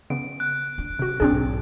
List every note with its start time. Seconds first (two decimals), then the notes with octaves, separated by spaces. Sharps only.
0.10 C#3 B3 D7
0.40 F#6
0.78 D4
0.99 C3 F#4
1.20 B1 G#2 C4 D4 G#4